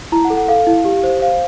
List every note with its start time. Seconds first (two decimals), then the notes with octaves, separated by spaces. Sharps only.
0.12 E4 A#5
0.25 F#5
0.30 A4
0.37 F#5
0.48 A4 F5
0.67 E4
0.85 G4
1.03 C5
1.21 C5 F5